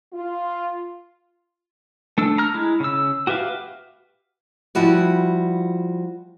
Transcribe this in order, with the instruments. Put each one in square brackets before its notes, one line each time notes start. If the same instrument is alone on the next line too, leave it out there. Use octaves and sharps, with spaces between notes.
[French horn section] F4
[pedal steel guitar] A3 D4 E6
A#5 F6
G#3 E4
C#3 E6
F#4 G4 B4 E5 F5
[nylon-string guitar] F3 G3 E4 F#4 D5